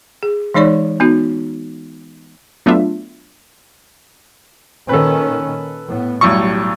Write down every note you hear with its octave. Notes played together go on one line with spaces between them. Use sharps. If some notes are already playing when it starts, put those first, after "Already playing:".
G#4
E3 G#3 D#4 C#5 D5 C#6
B3 D#4 F#4
F#3 A3 B3 D4 F4 E5
A#2 D#3 C#4 A4 B4
A2 B3
B1 A2 G3 C#6